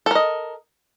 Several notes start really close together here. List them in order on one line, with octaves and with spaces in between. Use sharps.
A4 A#4 D#5